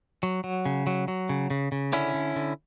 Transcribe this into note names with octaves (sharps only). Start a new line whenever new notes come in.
F#3
F#3
C#3
F#3
F#3
C#3
C#3
C#3
D3 C#4 E4
D3
D3